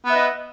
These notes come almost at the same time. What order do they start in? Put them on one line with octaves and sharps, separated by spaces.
B3 E5 B4 D#5